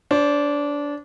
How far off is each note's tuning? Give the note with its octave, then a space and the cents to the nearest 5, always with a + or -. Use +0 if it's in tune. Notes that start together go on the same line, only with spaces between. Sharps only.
D4 -20 C5 +15